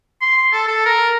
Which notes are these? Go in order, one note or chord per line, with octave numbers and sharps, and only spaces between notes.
C6
A4
A4
A#4